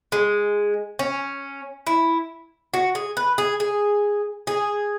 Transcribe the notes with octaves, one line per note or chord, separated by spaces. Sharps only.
G#3
C#4
E4
F#4
G#4
B4
G#4
G#4
G#4